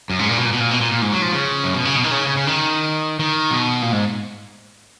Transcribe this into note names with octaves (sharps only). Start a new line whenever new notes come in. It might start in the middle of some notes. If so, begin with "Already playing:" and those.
F#2
G#2
A#2
B2
A#2
B2
A#2
B2
A#2
A#2
G#2
F#3
F3
C#3
F#2
B2
C#3
B2
D#3
C#3
C#3
C#3
D#3
D#3
B2
A#2
G#2